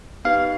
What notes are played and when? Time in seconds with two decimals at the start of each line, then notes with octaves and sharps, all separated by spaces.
0.25 B3 D#4 G4 B4 F5